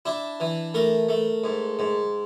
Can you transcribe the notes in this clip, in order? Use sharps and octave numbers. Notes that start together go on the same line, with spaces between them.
D4 E4
E3
A3 A#4
A3
G#2
G#2